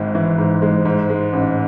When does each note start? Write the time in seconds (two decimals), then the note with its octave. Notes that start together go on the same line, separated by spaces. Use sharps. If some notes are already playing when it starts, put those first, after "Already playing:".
Already playing: G#1 G#2 G#3
0.15 E3
0.38 G#2
0.62 G#3
0.86 G#2
1.10 G#3
1.33 A1